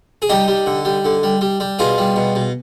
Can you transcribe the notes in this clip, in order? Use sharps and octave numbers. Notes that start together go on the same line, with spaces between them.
G#4
G3 D#4 G4
G3
D3
G3
D3
G3
G3
G3
B2 F4 G#4
G3
B2
B2